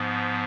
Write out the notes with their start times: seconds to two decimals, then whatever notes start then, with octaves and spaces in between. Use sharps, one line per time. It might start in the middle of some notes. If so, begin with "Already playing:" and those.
Already playing: G#2 F3 B3